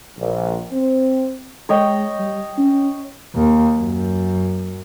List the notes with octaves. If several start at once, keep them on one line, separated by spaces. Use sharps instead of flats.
A#1
C4
G#3 C#5 D#5 G5
G3
C#4
D#2
F#2